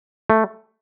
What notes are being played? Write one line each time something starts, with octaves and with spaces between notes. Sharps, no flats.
A3